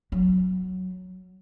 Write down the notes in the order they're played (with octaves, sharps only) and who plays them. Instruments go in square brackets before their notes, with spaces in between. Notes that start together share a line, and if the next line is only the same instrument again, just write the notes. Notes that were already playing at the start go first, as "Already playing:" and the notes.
[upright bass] F#3